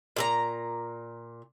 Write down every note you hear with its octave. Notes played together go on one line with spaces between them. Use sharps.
A#2 G#4 A#5